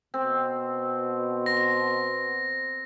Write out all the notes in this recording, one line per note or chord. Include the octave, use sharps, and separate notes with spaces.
B2 C4
C6 A#6